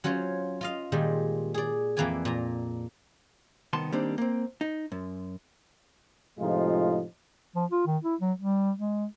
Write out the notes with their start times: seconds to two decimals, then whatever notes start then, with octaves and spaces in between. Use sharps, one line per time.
0.04 F#3 C#4 F4 C5 C#5
0.61 F4 D#5 F5
0.92 A#2 D#3 G3 G#3
1.54 G#4 D5
1.97 F2 E3 A#3 B4 D5 G#5
2.25 A#2 A#5
3.73 C2 D#3 B3 A5 C6
3.92 D#3 G3 A#3 C4 D4 D#4
4.18 A#3 C4
4.61 D#4
4.92 F#2
6.39 A2 C3 F3 G#3 D#4 F4
7.56 F3
7.72 F4
7.87 D#3
8.04 E4
8.21 F#3
8.39 G3
8.79 G#3